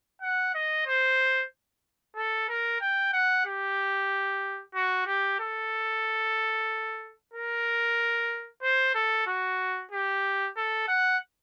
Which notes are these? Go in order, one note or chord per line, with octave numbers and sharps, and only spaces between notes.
F#5
D#5
C5
A4
A#4
G5
F#5
G4
F#4
G4
A4
A#4
C5
A4
F#4
G4
A4
F#5